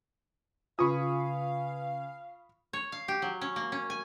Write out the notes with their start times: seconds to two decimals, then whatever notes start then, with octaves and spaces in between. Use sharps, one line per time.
0.79 C#3 F4 B4 F5 G#5 B5 C#6 D#6
2.73 C#5
2.92 F5
3.08 G4
3.22 F#3
3.41 C#4
3.56 A#3
3.72 C#4
3.90 G#5